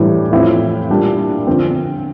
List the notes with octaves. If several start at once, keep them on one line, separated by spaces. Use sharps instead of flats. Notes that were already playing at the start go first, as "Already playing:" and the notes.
Already playing: A2 E3 G3 D4
A2 F3 C4 E4
A#2 G3 D4
D3 F3 C4